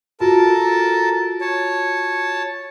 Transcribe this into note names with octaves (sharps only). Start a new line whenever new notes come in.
F4 F#4 A4 A#4 A5
C#5 A5